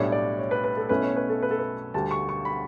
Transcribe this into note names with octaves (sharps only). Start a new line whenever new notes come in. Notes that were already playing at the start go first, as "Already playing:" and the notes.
Already playing: B1 A2 G3 D4 C#5
D5
C#5
B4
B4
A4
B1 B2 A3 C#4 E4 B4
C#5
B4
A4
B4
A4
B4
D2 D3 G3 A5
C#6
C#6
B5